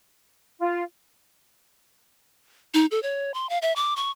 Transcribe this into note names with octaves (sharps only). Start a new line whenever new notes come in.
F4
D#4
A4
C#5
C6
F5
E5
D6
C#6